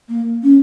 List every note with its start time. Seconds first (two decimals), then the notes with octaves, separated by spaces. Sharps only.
0.09 A#3
0.43 C#4